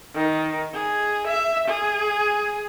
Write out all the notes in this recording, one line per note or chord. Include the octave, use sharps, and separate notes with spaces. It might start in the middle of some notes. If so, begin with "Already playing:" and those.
D#3
G#4
E5
G#4